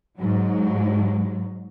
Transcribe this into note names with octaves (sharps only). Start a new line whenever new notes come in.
G#2 F#3